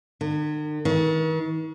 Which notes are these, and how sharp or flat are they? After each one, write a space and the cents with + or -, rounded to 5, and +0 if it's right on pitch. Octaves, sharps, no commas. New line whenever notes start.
D#3 -45
D#3 +45